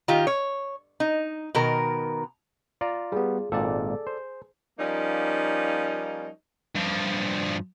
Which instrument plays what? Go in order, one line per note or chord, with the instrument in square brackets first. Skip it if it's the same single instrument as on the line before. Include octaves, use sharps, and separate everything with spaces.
[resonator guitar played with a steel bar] D#3 F4 G4
C#5
D#4
B2 D#3 A#4
[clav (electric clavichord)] F4 D5 A#5
[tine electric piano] G3 B3 [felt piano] G#4
[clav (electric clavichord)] G#1 A#2 [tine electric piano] A4 D5
[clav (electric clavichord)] C5
[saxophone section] F3 G3 A#3 C#4 D#4
[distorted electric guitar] G2 F3